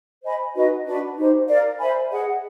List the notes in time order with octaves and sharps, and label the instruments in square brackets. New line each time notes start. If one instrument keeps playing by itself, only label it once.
[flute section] C5 D#5 G#5 B5
D#4 F#4 B4 D#5
D4 F#4 B4
D#4 G4 C5
A#4 D5 F5
C5 E5 G#5 B5
G#4 B4 D#5 F#5